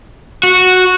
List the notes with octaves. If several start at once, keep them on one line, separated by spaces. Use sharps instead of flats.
F#4